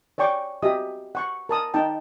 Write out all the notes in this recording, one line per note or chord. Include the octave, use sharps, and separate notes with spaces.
C#5 D5 G5 C#6 D6
F#4 G4 D#5 E5 D#6
F#5 C#6
A#4 A5 D#6
D#4 D#5 G5 A5